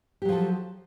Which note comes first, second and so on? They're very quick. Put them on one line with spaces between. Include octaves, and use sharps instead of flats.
G4 F#3 F3 A4